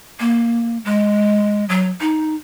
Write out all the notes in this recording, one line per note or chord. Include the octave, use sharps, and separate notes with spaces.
A#3
G#3
F#3
D#4